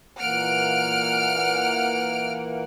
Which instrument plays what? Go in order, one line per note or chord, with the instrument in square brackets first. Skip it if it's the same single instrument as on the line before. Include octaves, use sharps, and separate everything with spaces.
[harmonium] A#2 E3 A#3 [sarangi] F#5 [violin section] F6 D7